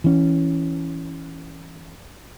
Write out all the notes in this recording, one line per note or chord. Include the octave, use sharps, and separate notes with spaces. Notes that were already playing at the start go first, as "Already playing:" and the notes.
E3 C#4